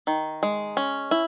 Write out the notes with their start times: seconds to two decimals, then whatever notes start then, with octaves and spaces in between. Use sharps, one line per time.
0.07 D#3
0.43 G#3
0.77 C#4
1.11 E4